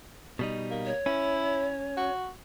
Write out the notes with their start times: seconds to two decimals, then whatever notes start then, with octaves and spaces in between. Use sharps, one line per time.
0.39 B2 G3 D#4
0.71 A#3
0.86 C#5
1.06 C#4 E4
1.97 F#4